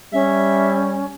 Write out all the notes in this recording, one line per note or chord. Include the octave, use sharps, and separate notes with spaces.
G3 C#4 E5